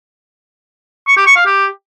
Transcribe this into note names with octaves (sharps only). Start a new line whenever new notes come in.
C#6
G4
C#6
F5
G4